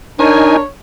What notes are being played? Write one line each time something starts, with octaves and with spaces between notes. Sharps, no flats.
D4 D#4 A#4 C#5 G#5